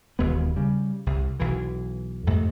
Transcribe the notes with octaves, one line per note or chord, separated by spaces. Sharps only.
E1 D#2 G#3 B3
C#3 G3
C2
B1 E3
F2 G#2 C3 A3